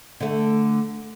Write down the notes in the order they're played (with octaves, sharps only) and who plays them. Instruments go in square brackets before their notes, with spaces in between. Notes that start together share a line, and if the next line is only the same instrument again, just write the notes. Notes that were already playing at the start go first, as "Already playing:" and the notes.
[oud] D3 A3